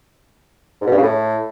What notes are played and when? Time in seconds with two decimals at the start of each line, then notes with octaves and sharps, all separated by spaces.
0.82 G#2
0.87 B2
0.92 G2
0.97 C#3
1.03 A2